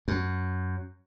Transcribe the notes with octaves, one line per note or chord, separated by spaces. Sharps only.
F#2